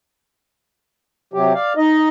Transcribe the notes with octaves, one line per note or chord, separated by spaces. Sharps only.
C3 F#3 G4
D5 F5
D#4 D#5